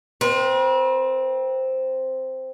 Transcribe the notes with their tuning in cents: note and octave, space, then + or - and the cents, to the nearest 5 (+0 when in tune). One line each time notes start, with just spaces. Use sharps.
C4 +0 B4 -45